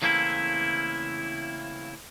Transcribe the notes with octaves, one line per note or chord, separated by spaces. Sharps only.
C#3 E3 A3 A#3 C4 E4